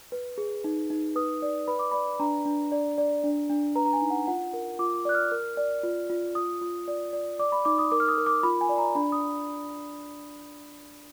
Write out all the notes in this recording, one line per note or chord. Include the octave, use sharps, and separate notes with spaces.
B4
G#4
D#4
D#4
B4 D#6
D5
B4 B5
D6
D5 B5
D4 A#5
D4
D5
D5
D4
D4
B4 A#5
A#5
G#5
D#4
F#5
F4 F#5
A#4
F4 D6
D5 F#6
F6
A#4
D5
F4
F4
F4 D#6
F4
D5
D5
D5 D6
B5
D#4 D6
D#6
A#4 D6
F6
D#6
A#4
D6
F4 B5
G#5
D5
A#5
D4 B5
D#6